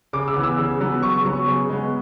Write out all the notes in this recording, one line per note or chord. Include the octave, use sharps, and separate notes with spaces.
C#3 D6
E6
E3 B3
E6
C#3
F#3 B3
C#3 C#6
F#3 B3
C#3
G#3 B3